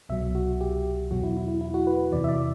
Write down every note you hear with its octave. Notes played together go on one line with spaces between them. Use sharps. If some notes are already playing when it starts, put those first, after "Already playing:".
C2 B2 F#3 E5
F#4
G4
E2 B2 F#3 F#4
E4
E4
E4
E4
F#4
B4
E2 C3 E3 D5
E5
D5